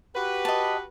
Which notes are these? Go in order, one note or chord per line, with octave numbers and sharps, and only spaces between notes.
F#4 G4 B4
D#5 A5